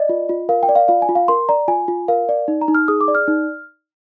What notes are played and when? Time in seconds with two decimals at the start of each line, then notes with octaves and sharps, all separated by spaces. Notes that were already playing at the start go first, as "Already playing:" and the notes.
Already playing: D5 D#5
0.09 F4
0.29 F4
0.49 A#4 F5
0.63 G5
0.69 D5
0.75 F5
0.88 F4 F5
1.02 G#5
1.09 F4
1.15 F5
1.28 A#4 C6
1.49 D5 A#5
1.68 F4 G#5
1.88 F4
2.08 A#4 F5
2.29 D5
2.48 D#4
2.61 A#5
2.68 D#4
2.75 F6
2.88 G#4 D#6
3.01 D6
3.08 D5
3.15 F6
3.28 D#4